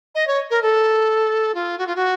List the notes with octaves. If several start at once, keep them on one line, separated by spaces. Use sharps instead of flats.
D#5
C#5
A#4
A4
F4
F#4
F4
F#4